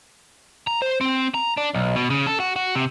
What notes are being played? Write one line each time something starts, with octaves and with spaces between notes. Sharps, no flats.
A#5
C5
C4
A#5
D4
B1
B2
C#3
A4
F#4
F#4
C3